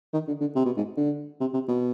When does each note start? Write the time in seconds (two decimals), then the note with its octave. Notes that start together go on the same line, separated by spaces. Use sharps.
0.13 D#3
0.28 D3
0.40 D3
0.56 C3
0.65 B2
0.77 G#2
0.97 D3
1.41 C3
1.54 C3
1.68 B2